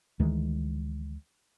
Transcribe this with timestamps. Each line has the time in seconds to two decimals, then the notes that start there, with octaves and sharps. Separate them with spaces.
0.19 D2 D#3 E3 G#3